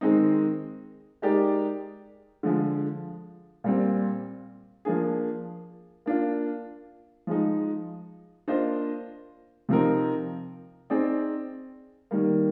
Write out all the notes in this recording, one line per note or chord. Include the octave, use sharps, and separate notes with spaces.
D#3 G#3 C4 D#4
G#3 D#4 G4 A#4 D5
D3 F3 G#3
A#2 G3 C4
F3 A#3 D4 G#4
A#3 D4 F4
F3 G#3 D#4
A#3 D4 F4 C5 D#5
C3 F3 C4 D#4 A#4
C4 D#4 G#4 D5
D#3 G3 A#3